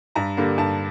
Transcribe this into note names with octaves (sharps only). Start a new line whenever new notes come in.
G2 A#5
D3 G3 A#3
G2 A5